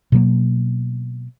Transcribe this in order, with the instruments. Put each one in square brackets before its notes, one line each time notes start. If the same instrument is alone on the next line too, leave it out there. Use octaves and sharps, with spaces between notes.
[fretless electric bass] B2 F#3 A#3